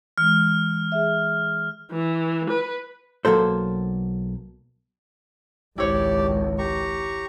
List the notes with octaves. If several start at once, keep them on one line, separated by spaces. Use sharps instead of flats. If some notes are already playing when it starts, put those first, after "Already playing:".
E3 G#3 F6
G#4 E5
E3
B4
B1 F#3 A#3 A4 C5
G#1 C#2 E4 G4 C#5 D5
G4 A#5 C#6